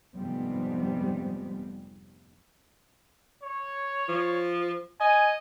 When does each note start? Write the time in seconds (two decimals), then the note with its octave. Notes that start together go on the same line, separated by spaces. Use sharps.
0.15 F1 G#2 F3 G3 B3 C4
3.43 C#5
4.08 F3
5.00 D#5 G#5